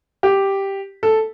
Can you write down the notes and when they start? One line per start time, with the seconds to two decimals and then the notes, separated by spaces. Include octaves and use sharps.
0.23 G4
1.03 A4